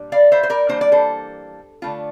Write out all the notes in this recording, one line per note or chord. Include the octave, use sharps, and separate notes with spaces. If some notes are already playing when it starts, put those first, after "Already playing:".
Already playing: A#2 G3 D4
D5 F5
C5 E5
C5
A#4 D5
E3 G3 A#3 D4 C5
D5
A4 C5
D3 A3 D4 F4